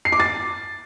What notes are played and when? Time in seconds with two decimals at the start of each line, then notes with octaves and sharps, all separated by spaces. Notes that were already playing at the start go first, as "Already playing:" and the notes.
0.05 C7
0.12 D6
0.20 A6